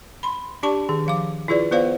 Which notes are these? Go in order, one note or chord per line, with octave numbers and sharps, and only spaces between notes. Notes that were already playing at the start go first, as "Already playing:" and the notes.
B5 C6
D4 G4 D5 A5 C#6
D#3 G#4
F3 F5 D6
E4 F4 G#4 B4 D5
B3 F4 B4 C5 D5 F5